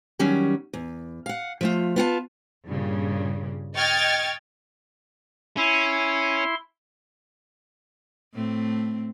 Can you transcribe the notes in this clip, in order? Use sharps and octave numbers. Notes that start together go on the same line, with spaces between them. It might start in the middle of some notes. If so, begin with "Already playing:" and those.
D#3 F#3 G3 C#4
E2
F5 F#5
F3 A3 F4
B3 F4 F#5 A5
G2 A#2 C#3
D#5 G5 C#6 F6 G#6 A6
C#4 E4 C6
A2 A3 C4